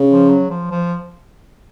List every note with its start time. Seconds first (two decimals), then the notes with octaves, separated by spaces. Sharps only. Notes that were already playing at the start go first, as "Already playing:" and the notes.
Already playing: C#3
0.09 F3
0.30 F#3
0.50 F3
0.71 F3